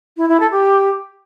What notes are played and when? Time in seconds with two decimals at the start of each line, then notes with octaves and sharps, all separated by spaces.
0.16 E4
0.28 E4
0.39 A4
0.51 G4